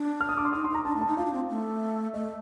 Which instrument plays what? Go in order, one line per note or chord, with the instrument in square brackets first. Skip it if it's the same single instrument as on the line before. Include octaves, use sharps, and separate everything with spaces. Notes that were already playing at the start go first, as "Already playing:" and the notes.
Already playing: [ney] D4
[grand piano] F6
D#6
D6
C6
[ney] D#4 [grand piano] D#6
[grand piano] C6
[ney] D#4 [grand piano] A#5
[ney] D4 [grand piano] A5
[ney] A3
[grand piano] A5
[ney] D#4
[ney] F4 [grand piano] F5
[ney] D4
C4
A3
[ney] A3 [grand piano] D#5